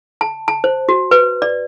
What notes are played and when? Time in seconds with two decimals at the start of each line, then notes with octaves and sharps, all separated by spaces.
0.21 A5
0.48 A5
0.64 C5
0.89 F#4
1.11 B4
1.42 D5